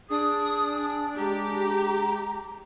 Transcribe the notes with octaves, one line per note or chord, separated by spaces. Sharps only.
D4 G#4 D#6
G#3 G4 A#5